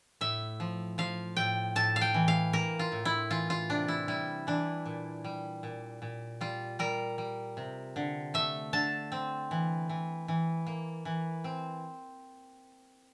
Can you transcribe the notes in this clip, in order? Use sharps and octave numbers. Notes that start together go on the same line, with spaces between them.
A2 E5
F3
F3 F5
A2 G5
A2 A5
F5
G5
E3
F5
A#3 A#4
F4
A2
E4
E3 F4
F4
C3 D4
E4
G3 E4
E3 D4
A#2
G3
A#2
A#2
G3 F4
G3 A#4
G3
C3
D3
A3 E5
D3 A5
C4
E3
E3
E3
A#3
E3
C4